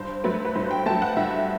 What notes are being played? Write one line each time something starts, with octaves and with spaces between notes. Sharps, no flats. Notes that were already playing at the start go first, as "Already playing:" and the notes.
Already playing: G2 C5
F#3 A3 B4
B4
G2 C5
G5
F#3 A3 A5
F#5
G2 E5